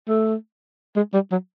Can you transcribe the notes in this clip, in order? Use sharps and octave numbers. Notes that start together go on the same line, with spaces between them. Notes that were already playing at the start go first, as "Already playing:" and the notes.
A3
G#3
G3
F#3